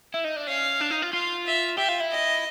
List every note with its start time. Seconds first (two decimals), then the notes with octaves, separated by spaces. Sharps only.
0.14 E4
0.24 D#4
0.36 D4
0.47 C#4 F5
0.81 D4
0.90 D#4
1.02 F4
1.13 F4 F5
1.46 E5
1.77 G4 E5
1.88 F4
2.00 E4
2.11 D#5